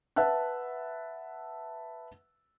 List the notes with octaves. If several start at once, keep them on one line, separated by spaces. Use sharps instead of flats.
B4 E5 F#5 A5 F#6